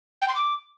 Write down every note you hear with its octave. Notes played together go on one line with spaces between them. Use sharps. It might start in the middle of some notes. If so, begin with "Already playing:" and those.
G5
C6
D6